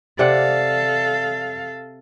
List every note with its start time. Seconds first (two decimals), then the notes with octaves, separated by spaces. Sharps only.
0.19 C3 A4 D5 F5 F#5